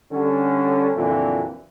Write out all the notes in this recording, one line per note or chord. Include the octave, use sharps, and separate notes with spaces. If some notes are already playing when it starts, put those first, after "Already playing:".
D3 G3 C#4
F2 A#2 D3 E3 F#3 C4